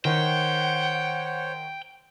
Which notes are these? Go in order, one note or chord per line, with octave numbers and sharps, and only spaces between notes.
D#3 C5 C#5 F#5 G5